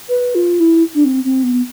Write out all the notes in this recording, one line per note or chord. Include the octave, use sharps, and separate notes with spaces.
B4
F4
E4
D4
C4
C4
B3